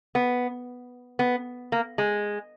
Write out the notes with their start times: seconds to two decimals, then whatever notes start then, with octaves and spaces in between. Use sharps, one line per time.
0.15 B3
1.19 B3
1.72 A#3
1.98 G#3